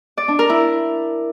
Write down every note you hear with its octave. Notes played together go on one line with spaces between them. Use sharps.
D5
D4
A#4
E4